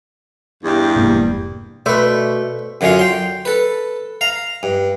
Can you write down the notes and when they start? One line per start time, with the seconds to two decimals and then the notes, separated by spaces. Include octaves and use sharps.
0.64 E2 G2 G3
0.96 F1 G#2 A#3
1.86 B2 A3 B4 C5 D5
2.81 F#2 D3 F#3 C#4 F4 F5
2.99 G5 C6
3.45 A4 B4
4.21 F5 A#5
4.63 G2